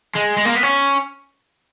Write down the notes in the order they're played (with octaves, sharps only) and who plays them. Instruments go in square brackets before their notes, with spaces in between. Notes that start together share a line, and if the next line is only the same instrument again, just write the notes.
[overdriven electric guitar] G#3
G#3
A#3
B3
C#4